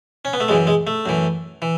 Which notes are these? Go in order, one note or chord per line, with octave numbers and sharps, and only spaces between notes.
C#4
B3
A3
F#2 E3 G#3
G#3
A3
F#2 E3
E3